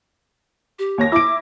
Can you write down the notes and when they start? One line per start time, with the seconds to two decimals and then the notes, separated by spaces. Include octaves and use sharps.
0.79 G4
0.98 D#2 C#5 A#6
1.12 E4 D6 D7